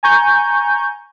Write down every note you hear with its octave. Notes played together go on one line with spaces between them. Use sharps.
G#5 A#5 C#6 G6